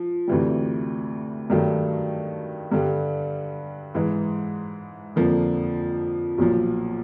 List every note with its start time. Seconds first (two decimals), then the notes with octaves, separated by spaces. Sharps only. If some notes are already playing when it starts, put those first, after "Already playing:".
Already playing: F3
0.28 D2 C3 E3 G3
1.50 G2 D#3 F#3 A3
2.72 G2 D3 G3
3.94 G#2 E3 G#3
5.16 F2 D3 F3 A#3
6.38 B1 A#2 F3